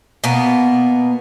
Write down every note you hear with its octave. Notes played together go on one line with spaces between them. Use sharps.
B2 A#3 B3